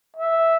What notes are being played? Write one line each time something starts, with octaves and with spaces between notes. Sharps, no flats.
E5